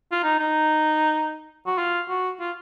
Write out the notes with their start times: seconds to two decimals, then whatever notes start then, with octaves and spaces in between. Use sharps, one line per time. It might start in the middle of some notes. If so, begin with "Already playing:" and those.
0.12 F4
0.23 D#4
0.39 D#4
1.66 F#4
1.78 F4
2.09 F#4
2.40 F4